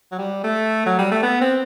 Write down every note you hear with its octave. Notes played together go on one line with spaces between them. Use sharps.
F#3
G3
A3
F#3
G3
A3
B3
C4